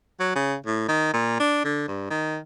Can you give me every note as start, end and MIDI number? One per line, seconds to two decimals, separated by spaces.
0.20 0.31 54
0.35 0.56 49
0.66 0.83 45
0.88 1.10 51
1.13 1.38 46
1.40 1.60 62
1.64 1.84 50
1.88 2.07 43
2.10 2.38 51